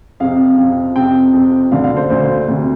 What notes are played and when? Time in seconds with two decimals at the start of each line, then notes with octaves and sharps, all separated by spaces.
0.20 F2 C3 F5
0.57 F2 C3
0.96 F2 C3 G5
1.33 F2 C3
1.71 D2 D3 F5
1.84 F5
1.97 C5
2.10 D2 D3 C5
2.48 D2 C3